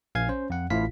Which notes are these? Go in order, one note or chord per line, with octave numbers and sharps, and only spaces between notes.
A#1 F5 G#5 G#6
C#4 C5
F2 F#5
A1 A2 E4 F4 F5 B6